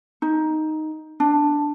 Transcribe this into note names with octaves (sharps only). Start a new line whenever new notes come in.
D#4
D4